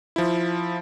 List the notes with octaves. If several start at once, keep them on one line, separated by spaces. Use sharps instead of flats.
F3 E4